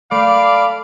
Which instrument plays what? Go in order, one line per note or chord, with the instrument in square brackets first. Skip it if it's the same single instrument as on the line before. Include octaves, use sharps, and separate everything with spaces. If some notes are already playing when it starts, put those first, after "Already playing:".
[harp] A3 [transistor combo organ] D5 [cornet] F5 [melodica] B5